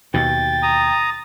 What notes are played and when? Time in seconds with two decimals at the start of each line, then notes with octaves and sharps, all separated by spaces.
0.14 D#2 B2 G5 A6
0.63 A#5 D#6